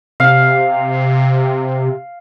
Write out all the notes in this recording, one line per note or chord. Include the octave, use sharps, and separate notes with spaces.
C3 F5